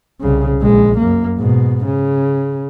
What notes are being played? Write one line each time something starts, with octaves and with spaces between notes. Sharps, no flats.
C2 C#3
A#1 G#3
F#2 A#3
G#2 B2
C#3